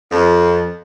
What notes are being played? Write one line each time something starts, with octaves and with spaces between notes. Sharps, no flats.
F2